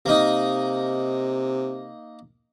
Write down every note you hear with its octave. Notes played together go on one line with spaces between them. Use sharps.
C3 A#3 D#4